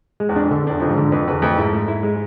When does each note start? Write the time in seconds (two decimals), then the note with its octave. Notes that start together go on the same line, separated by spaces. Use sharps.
0.20 G#3
0.29 E2
0.36 F2 D4
0.51 D3
0.67 E2 D4
0.80 F2 F3
0.89 G#2
0.97 D3
1.12 F2 B4
1.28 E2 B4
1.42 F2 A3
1.57 G#2 E4
1.73 A3
1.88 E4
2.03 G#3